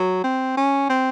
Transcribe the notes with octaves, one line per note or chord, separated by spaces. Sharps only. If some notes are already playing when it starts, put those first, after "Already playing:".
Already playing: F#3
C4
C#4
C4